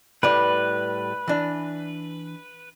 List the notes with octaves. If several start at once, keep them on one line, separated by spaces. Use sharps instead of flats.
A2 G3 B4 D5
E3 D4